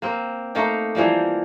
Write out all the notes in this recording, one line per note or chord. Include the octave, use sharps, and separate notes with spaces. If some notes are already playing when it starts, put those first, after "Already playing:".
A#3 C4
A3 A#3 D#4 G5
E3 F3 G3 A#3